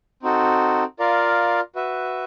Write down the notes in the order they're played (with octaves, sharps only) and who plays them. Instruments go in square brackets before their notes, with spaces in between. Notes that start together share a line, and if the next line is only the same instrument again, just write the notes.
[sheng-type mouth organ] C4 D#4 F#4 A4
F4 A#4 D5 F5
F#4 B4 E5